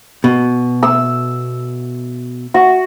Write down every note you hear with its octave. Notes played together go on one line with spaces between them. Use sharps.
B2
E6
F#4